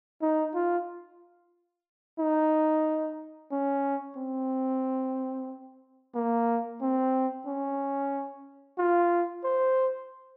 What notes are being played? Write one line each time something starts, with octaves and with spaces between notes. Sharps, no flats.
D#4
F4
D#4
C#4
C4
A#3
C4
C#4
F4
C5